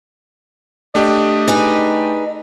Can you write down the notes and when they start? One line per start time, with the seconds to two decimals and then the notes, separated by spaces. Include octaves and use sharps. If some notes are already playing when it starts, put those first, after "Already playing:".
0.95 A3 D4 G4 D#5
1.48 D#4 G#4 B4